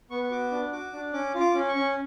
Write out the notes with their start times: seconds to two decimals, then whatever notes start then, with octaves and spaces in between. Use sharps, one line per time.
0.10 B3 C#6
0.23 C#6
0.30 F#4 D6
0.51 D4
0.72 F#4 D6
0.93 D4
1.13 C#4 D6
1.35 F4
1.40 D6
1.54 C#4
1.68 C#6
1.75 C#4